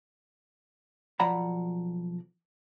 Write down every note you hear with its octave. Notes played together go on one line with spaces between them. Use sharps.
B1 F3 D5 F#5 A#5 B5